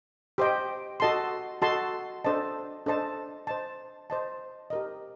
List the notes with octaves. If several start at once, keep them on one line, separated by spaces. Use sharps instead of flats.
G4 C5 D#5 G5
F#4 A4 D#5 A5 C6
F#4 A4 D#5 A5 C6
D4 A4 C5 D#5 A5
D4 A4 C5 D#5 A5
C5 D#5 A5
C5 D#5 A5
G4 A#4 D#5